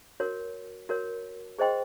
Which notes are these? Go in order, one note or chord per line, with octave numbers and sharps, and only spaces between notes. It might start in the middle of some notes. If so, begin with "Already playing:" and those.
F#4 A#4 C#5
F#4 A#4 C#5
G#4 C5 D#5 G5 C6